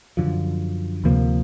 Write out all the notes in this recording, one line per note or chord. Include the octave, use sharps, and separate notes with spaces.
F#2 D3 F3
D2 C3 F3 A#3